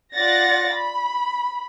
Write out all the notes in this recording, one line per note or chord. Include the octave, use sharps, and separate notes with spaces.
F4 D5 F#5 A6 A#6
B5